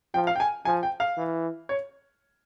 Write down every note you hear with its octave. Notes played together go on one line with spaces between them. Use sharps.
F3 G5
F5
G5
G#5
F3 G#5
G5
F5
E3
C#5